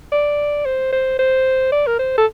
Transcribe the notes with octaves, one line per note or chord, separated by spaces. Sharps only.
D5
C5
C5
C5
D5
A#4
C5
A4